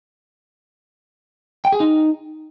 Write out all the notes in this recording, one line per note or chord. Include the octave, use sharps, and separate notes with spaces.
G5
G#4
D#4